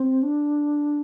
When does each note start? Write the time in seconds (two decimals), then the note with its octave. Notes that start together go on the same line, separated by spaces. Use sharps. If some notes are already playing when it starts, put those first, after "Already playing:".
Already playing: C4
0.23 D4